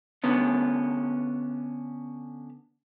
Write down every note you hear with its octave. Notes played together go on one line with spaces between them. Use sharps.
D3 B3 C#4